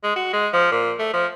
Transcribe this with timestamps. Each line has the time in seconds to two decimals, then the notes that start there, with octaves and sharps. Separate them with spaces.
0.04 G#3
0.16 F#4
0.33 G#3
0.53 F3
0.72 A#2
0.99 A3
1.13 F3